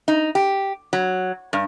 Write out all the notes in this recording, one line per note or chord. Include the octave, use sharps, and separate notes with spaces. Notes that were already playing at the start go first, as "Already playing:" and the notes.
D#4
G4
F#3
G2